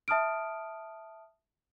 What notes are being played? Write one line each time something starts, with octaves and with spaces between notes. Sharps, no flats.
E5 A5 D#6 F6 D7